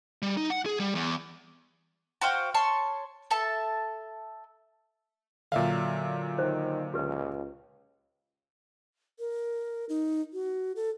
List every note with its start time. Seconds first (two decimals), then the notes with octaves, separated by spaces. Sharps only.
0.22 G3
0.37 D#4
0.50 F#5
0.66 G#4
0.80 G3
0.95 E2
2.21 F#4 C5 F5 G5
2.54 C#5 A5 C6 C#6
3.31 A4 E5 A5
5.52 A#2 D3 F#3 E5 F5
6.39 D#3 C5
6.94 C#2 G4 B4
9.19 A#4
9.89 D#4
10.33 F#4
10.76 A4